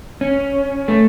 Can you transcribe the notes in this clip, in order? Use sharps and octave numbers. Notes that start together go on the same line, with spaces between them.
C#4
A3